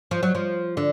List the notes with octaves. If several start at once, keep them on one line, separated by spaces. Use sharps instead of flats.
F3
F#3
F3
D3